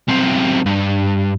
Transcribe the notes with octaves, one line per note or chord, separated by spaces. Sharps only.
B1 C4
G2